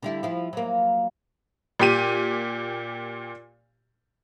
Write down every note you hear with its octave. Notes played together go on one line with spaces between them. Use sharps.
D3 G3 E4
F3 E4
F#3 A#3
A#2 G4 D#7